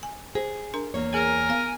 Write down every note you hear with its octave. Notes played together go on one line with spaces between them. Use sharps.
G#5
G#4 C5
D4 A#4 A#5
E2 A#3 C#5
G#4 A#4 G#5
B3 F5